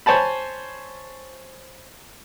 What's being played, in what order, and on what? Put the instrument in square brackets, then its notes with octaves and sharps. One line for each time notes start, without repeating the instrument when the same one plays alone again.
[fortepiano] C5 C#5 G#5 A5 B5